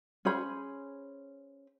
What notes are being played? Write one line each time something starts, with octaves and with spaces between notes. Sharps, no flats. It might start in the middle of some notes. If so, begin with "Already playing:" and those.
C#4 G#4 C5 B5